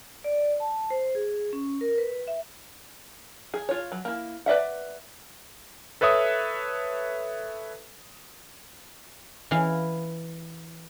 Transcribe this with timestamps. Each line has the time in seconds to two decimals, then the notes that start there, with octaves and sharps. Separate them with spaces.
0.24 D5
0.60 A5
0.90 C5
1.15 G#4
1.53 C#4
1.81 A#4
1.98 B4
2.27 E5
3.54 G#4
3.69 F4 C#5
3.92 F#3
4.05 A#3 E4
4.46 B4 D5 E5 F#5
6.01 A4 B4 C#5 E5 D#6
9.51 E3 E4 F5